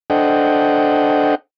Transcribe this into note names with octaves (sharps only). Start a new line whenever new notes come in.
D4 A4 C5 D#5 F#5 G5